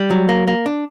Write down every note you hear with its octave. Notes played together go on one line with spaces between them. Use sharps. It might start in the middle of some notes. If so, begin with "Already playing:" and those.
Already playing: G3
F#3
A#3
A#3
D4